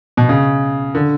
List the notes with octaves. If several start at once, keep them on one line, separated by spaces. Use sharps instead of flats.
B2
C#3
D3